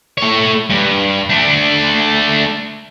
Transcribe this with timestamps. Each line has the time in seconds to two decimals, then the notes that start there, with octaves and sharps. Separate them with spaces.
0.18 A3 C#5
0.70 G2
1.30 A3 D4